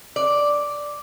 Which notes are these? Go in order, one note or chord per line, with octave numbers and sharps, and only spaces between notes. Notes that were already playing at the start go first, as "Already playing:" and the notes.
D5